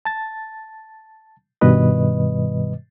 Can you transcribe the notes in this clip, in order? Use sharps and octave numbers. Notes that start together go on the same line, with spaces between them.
A5 A6
G2 B2 D#3 G3 B4 D#5